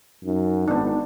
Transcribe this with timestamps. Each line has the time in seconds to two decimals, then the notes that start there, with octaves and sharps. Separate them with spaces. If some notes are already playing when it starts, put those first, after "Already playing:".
0.24 F#2 D#4
0.68 G#1 B3 D4